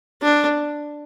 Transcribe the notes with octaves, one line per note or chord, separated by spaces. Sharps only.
D4